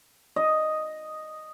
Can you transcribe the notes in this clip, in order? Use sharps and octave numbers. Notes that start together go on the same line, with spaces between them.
D#5